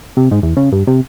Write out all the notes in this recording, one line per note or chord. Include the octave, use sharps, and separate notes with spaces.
C3
G#2
E2
C#3
G2
C3